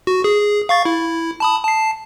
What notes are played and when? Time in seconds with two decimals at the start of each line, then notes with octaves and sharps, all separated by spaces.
0.07 F#4
0.24 G#4
0.69 F5 C#6 A6
0.85 E4
1.40 A5 B5 D#6
1.64 A5 C7